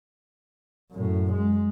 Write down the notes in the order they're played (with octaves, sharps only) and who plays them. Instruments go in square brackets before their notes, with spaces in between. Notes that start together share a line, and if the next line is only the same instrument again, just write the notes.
[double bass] F#2 A2
G#3